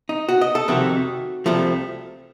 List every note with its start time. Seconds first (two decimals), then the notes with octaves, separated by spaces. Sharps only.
0.09 D#4
0.29 F#4
0.41 D#5
0.55 A4
0.68 F2 C3 D#3 A3 C4 F#4
1.46 C2 C3 F3 A3